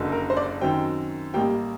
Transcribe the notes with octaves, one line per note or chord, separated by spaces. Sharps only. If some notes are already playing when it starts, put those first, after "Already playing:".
Already playing: F#1 F#2 D3
A#4
C5
D5
F#2 D#3 F#3 C4 G5
A1 A2 G3 A#3 G5